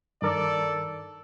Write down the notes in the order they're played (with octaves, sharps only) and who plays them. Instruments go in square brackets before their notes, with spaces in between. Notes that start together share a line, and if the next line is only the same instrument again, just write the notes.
[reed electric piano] G2 D#3 A#4 [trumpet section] A4 D5